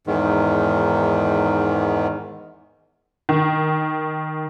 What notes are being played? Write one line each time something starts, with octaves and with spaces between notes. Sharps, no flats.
E2 G#2 D#3
D#3